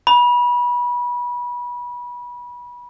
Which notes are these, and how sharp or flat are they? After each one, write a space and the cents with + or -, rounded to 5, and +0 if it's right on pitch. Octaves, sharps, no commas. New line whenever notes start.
B5 -25